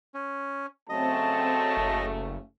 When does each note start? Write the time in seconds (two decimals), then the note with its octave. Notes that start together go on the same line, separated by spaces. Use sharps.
0.14 C#4
0.90 C#3 F#3 A3 C4 D#5 A5
1.77 F#1